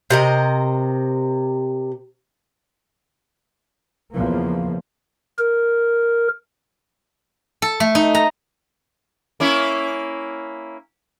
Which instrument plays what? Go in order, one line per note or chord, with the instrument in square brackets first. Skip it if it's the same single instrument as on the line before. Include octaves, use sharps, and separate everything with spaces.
[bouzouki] C3 A#4 D#5
[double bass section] E2 C#3 F3 A#3
[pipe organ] A#4
[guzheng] A4
A3
D#4
A#5
[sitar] A#3 C#4 E4